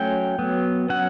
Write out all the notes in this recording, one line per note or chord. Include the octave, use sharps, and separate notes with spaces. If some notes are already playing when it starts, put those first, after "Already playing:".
Already playing: F#3 A3 C#4 G5
F#3 B3
F#3 C#4 F#5